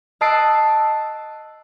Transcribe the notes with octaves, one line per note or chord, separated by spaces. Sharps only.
D#5 A5 E6 F#6 C7 D7